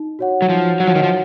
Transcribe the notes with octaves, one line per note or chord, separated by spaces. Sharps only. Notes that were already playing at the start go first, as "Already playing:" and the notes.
Already playing: D#4
F#4 C#5 F#5
F#3
F3 D#4
F#3 F#4 C#5 F#5
F3
D#3
F3